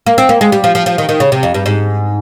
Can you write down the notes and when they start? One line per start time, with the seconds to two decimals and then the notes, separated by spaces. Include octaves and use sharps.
0.06 A#3
0.18 C4
0.29 A#3
0.41 G#3
0.52 G3
0.64 F3
0.75 F3
0.86 F3
0.98 D#3
1.09 D#3
1.20 C#3
1.32 C3
1.43 F2
1.54 G2
1.66 G#2